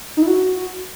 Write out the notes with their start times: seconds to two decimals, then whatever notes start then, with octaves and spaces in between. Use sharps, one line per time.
0.17 D#4
0.22 E4
0.27 F#4